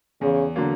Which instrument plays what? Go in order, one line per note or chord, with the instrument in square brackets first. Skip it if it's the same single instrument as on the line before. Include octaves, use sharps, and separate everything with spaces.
[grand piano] E2 [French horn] C#3
[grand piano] D3 F#3 A#3